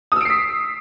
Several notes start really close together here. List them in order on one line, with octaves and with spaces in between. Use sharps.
D#6 E6 D7 C7 B6